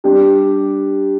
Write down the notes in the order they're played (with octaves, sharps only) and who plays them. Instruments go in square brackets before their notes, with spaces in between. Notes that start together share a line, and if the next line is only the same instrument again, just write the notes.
[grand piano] G3 D4 G4